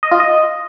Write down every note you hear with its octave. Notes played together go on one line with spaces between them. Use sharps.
D#5
F4
D#5